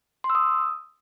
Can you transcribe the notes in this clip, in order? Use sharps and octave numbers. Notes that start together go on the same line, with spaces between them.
C6
E6
D#6